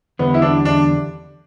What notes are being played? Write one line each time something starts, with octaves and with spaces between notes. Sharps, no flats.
E2 D3 G3 B3
E4
D4
D4